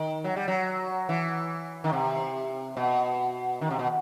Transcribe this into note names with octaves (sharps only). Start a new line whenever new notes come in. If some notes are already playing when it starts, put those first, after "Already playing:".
Already playing: D#3
F#3
G3
F#3
E3
D#3
C3
B2
D#3
C3
B2